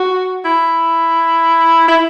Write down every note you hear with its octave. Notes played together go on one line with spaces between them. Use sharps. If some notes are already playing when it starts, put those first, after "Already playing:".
Already playing: F#4
E4
E4